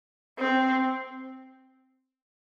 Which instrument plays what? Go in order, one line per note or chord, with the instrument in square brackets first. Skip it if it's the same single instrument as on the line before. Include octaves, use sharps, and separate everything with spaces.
[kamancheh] C4